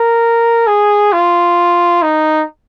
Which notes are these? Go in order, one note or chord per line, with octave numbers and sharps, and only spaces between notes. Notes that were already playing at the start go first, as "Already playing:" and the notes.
Already playing: A#4
G#4
F4
D#4